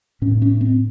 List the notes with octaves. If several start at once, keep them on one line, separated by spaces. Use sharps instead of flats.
A2 C#4
C#4
C4